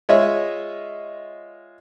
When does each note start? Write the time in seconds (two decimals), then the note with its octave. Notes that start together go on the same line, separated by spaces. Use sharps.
0.09 G#3 F4 C#5 D#5 E5